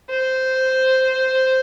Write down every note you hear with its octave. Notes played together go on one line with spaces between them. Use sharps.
C5